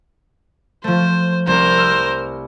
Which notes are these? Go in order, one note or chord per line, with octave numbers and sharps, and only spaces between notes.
F3 A3 C5
C2 A#4 C5
E6 F6